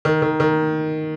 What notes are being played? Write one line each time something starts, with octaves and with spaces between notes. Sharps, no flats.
D#3
D#3
D#3